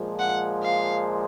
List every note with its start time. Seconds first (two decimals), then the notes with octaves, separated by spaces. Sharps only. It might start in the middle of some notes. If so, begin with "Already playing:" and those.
Already playing: A#2 F3 G#3
0.19 F#5
0.63 F5